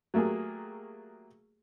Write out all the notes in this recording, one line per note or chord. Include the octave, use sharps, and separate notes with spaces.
F#3 A3 A#3 G4 G#4